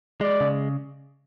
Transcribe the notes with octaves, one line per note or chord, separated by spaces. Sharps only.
G#3 D5
C#3